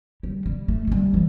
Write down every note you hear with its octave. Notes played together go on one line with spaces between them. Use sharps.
G3
G3
A3
A3
G3
E3